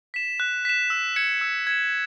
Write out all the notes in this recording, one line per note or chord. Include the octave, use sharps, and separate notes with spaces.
B6 E7
F#6
B6 E7
E6
G#6 C#7 E7
E6
G#6 C#7 E7